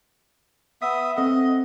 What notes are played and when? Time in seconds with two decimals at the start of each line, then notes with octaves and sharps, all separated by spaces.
0.82 B3 E5 D#6 B6
1.17 C4 A4 D#5 F#5